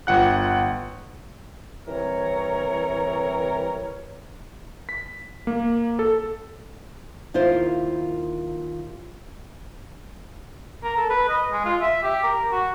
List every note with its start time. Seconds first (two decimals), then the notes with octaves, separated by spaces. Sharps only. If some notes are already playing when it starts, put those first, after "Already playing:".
0.07 G1 F4 F#5 G5 F#6
1.87 C2 E3 C4 A#4 C#5
4.89 B6
5.47 A#3
5.99 A4
7.34 D#2 E4 F4 A#4 C5
10.84 A#4
10.97 A4
11.10 B4
11.29 D#5
11.52 G#3
11.65 F4
11.81 E5
12.03 G4
12.24 A#4
12.52 F#4